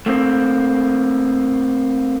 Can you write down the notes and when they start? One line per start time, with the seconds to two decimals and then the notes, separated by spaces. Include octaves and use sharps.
0.06 A3 A#3 C4